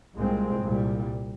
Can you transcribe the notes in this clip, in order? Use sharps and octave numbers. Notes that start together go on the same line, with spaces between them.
C2 A#2 G#3 C4
C2 A#2 G3